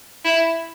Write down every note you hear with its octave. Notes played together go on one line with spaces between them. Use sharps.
E4